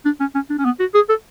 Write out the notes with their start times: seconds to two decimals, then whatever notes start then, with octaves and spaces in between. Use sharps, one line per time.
0.05 D4
0.20 C#4
0.35 C#4
0.50 D4
0.59 C#4
0.65 B3
0.80 F#4
0.95 G#4
1.09 A4